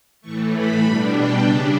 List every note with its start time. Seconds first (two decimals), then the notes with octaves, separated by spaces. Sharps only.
0.21 A2 E3 A3 C#6
0.51 B5
0.81 B2 G3 D4 B5
1.11 G5
1.40 C#3 G3 D4 E5